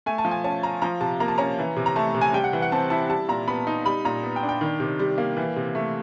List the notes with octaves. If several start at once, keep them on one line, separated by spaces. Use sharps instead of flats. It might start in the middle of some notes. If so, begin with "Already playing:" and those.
A3 G#5
A5
F3
G#5
C#4 A5
F4 A#5
F3 A#5
C3 A5
A#3 A#5
A5
C#4 A#5
E3
C3
A#5
A3 A5
C3
G#5
G3 G5
F#5
E3
F#5
C4 A5
E4 A5
G3 A5
A#2 A#5
B3 B5
D#4
G3 B5
A#2 A#5
B3
G5
D4
G5
D#3
C3
G3
A#3
E3
C3
A3